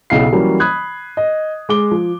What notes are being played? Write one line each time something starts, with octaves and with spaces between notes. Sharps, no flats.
B1 C#3 E4 F5 C7
E3 F#3 G3 A#3 C#4
B5 D#6 F#6 G#6
D#5
G#3 D6 G7
F3